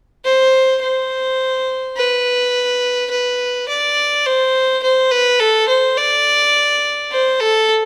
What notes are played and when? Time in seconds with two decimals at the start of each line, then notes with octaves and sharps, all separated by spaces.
0.25 C5
0.82 C5
1.97 B4
3.11 B4
3.69 D5
4.26 C5
4.83 C5
5.11 B4
5.40 A4
5.68 C5
5.97 D5
7.11 C5
7.40 A4